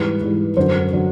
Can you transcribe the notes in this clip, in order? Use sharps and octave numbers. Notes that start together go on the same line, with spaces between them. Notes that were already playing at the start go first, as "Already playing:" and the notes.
Already playing: G#2 E3 G3 B4
G#2 E3 G3
F#2 D3 F#3 C5
D3 F#3